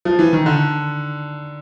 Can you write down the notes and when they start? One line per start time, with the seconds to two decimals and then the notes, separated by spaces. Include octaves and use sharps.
0.05 F3
0.19 E3
0.33 D#3
0.46 D3